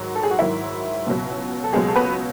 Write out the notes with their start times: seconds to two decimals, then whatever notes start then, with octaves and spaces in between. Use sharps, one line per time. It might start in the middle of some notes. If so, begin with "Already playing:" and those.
Already playing: G#2 D#3 F#3
0.15 A4
0.23 G#4
0.31 F#4
0.39 G#2 D#3 F#3 E4
1.06 C#2 B2 F#3
1.64 A4
1.73 C#2 B2 F#3 G#3 G#4
1.88 A4
1.96 B3 B4